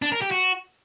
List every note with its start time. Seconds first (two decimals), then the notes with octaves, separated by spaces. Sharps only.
0.02 D4
0.12 A#4
0.22 G4
0.31 F#4